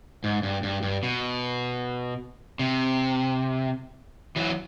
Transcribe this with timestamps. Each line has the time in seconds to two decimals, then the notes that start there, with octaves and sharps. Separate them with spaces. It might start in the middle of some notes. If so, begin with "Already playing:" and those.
0.24 G#2
0.43 G2
0.63 G2
0.83 G2
1.03 B2
2.59 C3
4.36 E3 F#3